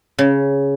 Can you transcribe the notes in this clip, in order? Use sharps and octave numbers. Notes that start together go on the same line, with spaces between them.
C#3